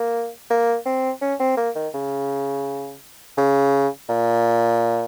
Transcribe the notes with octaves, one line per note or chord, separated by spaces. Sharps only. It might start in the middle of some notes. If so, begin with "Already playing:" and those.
Already playing: A#3
A#3
C4
C#4
C4
A#3
D#3
C#3
C#3
A#2